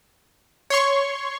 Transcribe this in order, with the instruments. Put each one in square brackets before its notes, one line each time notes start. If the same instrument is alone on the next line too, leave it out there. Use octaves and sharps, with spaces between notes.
[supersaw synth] C#5 C6 C#6